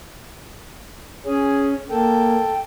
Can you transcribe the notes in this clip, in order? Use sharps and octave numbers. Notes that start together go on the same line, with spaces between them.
C#4 G#4
A#3 A4 G5